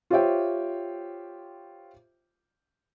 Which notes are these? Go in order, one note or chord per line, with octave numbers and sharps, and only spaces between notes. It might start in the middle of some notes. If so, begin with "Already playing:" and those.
F4 G4 C5 C#5 E5 G5